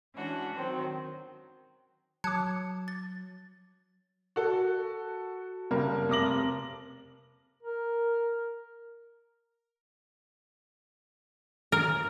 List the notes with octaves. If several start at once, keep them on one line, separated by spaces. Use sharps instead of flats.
E3 G#3 C#4 D4 F#4
D#3 F#3 C4
F#3 A5 D6 F#6 G#6 C#7
A6
F#4 A4
F#1 G3 A#3 A#4
F1 A#4 D6 A#6 F#7
A#4
A#4